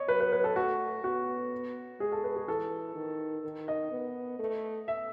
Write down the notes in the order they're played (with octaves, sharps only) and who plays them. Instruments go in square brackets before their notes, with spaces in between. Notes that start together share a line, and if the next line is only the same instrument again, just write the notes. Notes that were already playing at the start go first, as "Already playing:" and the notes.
Already playing: [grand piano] C#5 D#5
[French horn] F#3 [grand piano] B4
[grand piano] B4
B4
A4
[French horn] A3 [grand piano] F#4
[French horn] B3 [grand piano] F#4
[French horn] G#3 [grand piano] G#4
[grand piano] A4
B4
G#4
[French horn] E3 [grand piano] A4
[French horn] D#3
D#3
[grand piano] D#5
[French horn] B3
A3
[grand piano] E5